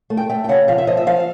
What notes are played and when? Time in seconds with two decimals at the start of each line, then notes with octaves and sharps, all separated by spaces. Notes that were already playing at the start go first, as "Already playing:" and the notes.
0.10 A3
0.17 G5
0.30 A3 G5
0.44 G5
0.49 C#3 F#5
0.68 F3 F5
0.78 E5
0.87 F3 D#5
0.97 E5
1.07 F3 F5